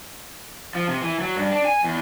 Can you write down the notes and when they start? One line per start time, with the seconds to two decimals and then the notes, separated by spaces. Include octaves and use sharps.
0.75 F3
0.88 C3
1.02 E3
1.21 F#3
1.37 G2
1.52 D4
1.65 G#5
1.84 E2